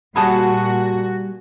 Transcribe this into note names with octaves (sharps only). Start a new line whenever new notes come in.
A#2 G3 F#4 G#4 F#5 A5 B5 D#6